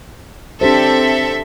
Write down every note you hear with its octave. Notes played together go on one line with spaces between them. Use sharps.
C4 D4 G4 A4 C5 E5